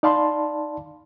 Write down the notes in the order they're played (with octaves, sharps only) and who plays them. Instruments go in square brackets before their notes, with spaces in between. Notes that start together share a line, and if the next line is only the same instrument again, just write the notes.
[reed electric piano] D#4 D5 F5 A5 B5 C6